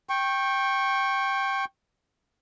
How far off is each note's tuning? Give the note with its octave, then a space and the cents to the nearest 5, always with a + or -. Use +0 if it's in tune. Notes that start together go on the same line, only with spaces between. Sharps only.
G5 +0 C#6 -25